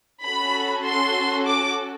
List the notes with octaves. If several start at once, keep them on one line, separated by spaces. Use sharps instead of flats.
C#4 F#4 A4 B5
C6
D6